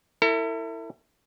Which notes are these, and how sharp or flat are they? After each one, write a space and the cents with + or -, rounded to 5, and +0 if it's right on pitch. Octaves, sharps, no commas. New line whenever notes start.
E4 +0 A4 +45